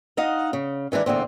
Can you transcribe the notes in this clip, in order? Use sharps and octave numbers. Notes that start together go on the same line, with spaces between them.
D#4 D#5 F5 F#5
C#3
D#3 E3 G#3 D4
E2 A#2 D3 C4